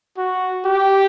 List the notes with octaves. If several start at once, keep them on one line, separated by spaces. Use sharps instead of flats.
F#4
G4